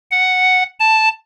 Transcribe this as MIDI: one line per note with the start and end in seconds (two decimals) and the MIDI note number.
0.11 0.63 78
0.80 1.09 81